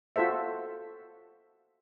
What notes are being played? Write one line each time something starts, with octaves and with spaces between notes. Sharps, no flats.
F4 F#4 A4 C5 E5